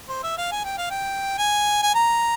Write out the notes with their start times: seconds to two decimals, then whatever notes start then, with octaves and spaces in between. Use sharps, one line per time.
0.09 C5
0.23 E5
0.38 F5
0.52 G#5
0.65 G5
0.78 F5
0.90 G5
1.38 G#5
1.83 G#5
1.95 A#5